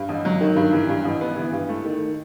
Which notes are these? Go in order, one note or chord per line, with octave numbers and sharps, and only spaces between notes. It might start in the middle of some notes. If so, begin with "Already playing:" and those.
Already playing: G2
A1
F#3
D#3
G2
E3
G2
A1
B3
E3
G2
A3
D#3